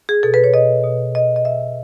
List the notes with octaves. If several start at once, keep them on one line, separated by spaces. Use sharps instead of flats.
G#4
B2 A4
B4
C#5
B2 D#5
B2
B2 D#5
D#5
B2 E5